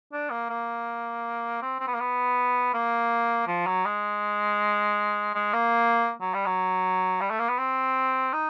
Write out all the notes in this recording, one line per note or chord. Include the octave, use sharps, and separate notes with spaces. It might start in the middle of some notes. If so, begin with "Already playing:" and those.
D4
A#3
A#3
C4
C4
B3
A#3
B3
A#3
F3
F#3
G#3
G#3
A#3
F#3
G3
F#3
G3
A3
A#3
B3
C4
D#4